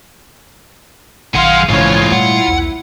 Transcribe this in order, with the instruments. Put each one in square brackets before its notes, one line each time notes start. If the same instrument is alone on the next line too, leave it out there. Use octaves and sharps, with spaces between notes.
[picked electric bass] A#1 D#3 [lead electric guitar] F#2 F#5 [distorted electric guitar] G#4 C6 [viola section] F5
[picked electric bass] A#1 C#3 [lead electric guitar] G#2 E3 [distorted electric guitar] F4 [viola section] C#5
[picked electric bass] A#2 G3 A3 [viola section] E4 [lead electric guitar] F#5
[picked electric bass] B1 E2